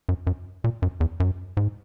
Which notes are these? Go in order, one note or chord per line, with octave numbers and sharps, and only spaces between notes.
F#2
F#2
A#2
F#2
E2
F#2
G#2